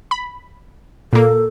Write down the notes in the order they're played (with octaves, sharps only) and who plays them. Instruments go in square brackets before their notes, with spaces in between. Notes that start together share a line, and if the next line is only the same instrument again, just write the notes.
[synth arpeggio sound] B5
[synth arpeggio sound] A#2 A#3 [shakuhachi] A4